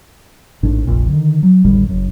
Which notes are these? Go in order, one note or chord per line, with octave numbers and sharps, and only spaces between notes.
A1 G#2 D4
F1 A#1 A#2
D3 D#3
F#3
G#1 D2 A2 G3
F#1 F#2